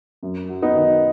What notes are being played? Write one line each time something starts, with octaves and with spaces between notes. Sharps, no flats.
F#2
F#3
B3 D#4
D#3